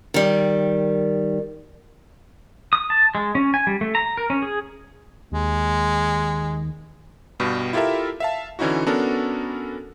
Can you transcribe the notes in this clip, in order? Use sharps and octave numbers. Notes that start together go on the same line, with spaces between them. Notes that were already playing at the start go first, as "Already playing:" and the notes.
D#3 G3
D#6
A5
G#3
C#4
G#5
G3
A3
A#5
A#4
C#4
G#4
D#2 G#3
G2 B2 G3
E4 F4 G4 A4 A#4 E5
E5 F5 A5
D3 E3 C#4 D#4 E4 F#4
B3 C#4 D4 F#4 A4 A#4